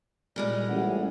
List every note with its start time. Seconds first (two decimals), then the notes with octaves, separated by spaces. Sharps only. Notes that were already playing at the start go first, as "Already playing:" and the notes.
0.36 A#2 G3 G#3 D5
0.69 A1 F#5